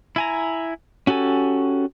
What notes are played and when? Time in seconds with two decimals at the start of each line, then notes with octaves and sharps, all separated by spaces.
0.16 E4 G#5 A#5
1.07 C#4 F#4 G4 A4 G#5